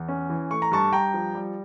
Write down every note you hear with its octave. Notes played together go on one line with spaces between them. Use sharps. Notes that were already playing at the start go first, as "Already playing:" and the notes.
Already playing: E2
C#4
E3
A3 C#6
A#5
G2 A5 C#6
G2 G5 A#5
F3
G3